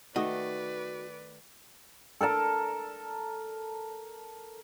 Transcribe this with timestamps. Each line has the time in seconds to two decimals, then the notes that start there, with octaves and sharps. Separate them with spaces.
0.16 D#3 A3 F#4 B4 D5 D#5
2.21 A4 A#4 A5 A#5